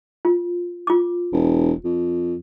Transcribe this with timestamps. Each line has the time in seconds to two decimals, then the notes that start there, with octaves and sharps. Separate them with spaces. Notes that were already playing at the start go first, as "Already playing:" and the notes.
0.25 F4
0.87 F4 D6
1.32 E1
1.84 F2